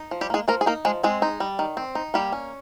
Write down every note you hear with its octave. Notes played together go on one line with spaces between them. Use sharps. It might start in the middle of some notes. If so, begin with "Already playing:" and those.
Already playing: D#4
F3
G3 G4
G#3 A#3 G#4
F3 A#3 A#4
G#4
A#3 D#4 A#4
F3 G#3 G#4
G#3 C4 G#4
D#4
G3
D#3
C4
D#4
G3 A#3 G4
C#4